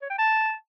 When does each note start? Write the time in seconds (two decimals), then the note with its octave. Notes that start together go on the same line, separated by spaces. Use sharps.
0.02 C#5
0.10 G5
0.18 A5